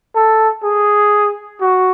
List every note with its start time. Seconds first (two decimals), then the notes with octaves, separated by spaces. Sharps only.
0.15 A4
0.63 G#4
1.61 F#4